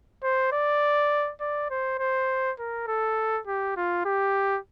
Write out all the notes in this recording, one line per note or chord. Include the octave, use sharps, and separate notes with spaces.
C5
D5
D5
C5
C5
A#4
A4
G4
F4
G4